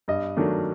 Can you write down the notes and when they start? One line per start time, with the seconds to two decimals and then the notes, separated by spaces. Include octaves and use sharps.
0.08 G2 D#5
0.37 D#3 F#3 A3 D4